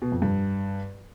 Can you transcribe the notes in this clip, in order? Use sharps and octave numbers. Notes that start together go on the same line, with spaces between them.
B2
F2
G2